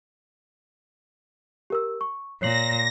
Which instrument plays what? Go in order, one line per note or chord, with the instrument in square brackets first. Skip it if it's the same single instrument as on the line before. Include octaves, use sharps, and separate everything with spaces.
[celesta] G4 A#4 E6
C#6
[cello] A#2 [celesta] C#5 C7 F#7 [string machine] A#6